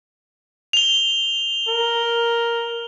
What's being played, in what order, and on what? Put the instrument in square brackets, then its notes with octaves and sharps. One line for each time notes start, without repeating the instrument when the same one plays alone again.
[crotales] F7 G7
[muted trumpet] A#4